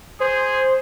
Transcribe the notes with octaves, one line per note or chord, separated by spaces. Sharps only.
G#4 C5